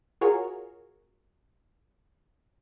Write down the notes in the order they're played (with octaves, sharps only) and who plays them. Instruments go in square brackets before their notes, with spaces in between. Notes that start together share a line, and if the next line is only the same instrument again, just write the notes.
[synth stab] F4 F#4 G#4 A#4 C#5